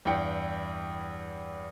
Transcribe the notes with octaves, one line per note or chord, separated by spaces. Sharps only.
E2 G2 E4 G5 C#7